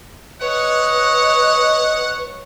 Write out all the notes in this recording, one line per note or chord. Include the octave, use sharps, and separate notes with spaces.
B4 C#5 D#5 F#5